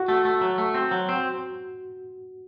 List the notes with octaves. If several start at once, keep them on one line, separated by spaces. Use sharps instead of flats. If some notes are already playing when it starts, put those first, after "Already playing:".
Already playing: F#4
A3
A3
F#3
A3
C4
F#3
C4